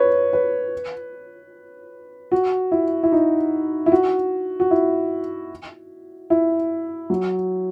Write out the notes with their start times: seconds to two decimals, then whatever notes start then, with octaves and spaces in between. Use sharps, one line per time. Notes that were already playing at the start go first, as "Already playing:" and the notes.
Already playing: B4 C#5
0.33 B4
2.32 F#4
2.72 E4
3.03 E4
3.12 D#4
3.86 E4
3.92 F#4
4.60 F#4
4.71 E4
6.30 E4
7.10 F#3